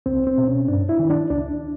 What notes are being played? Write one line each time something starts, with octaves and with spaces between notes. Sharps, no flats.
C#2 C4
C4
B2
C#4
G2 D4
E4
D#3
D4
C#2 D4